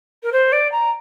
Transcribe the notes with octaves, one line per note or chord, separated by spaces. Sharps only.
A#4
C5
D5
A#5